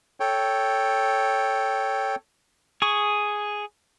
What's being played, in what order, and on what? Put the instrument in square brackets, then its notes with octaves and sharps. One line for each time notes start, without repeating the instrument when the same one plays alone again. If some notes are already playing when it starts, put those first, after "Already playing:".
[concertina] A4 C#5 G5
[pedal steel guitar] G#4 C#6